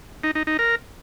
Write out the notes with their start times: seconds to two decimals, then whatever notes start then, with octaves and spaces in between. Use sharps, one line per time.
0.24 D#4
0.35 D#4
0.47 D#4
0.59 A#4